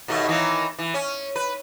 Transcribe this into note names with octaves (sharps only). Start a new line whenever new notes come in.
D#2 B2 A3
D#3 E3 A#3
E3
C#4
B4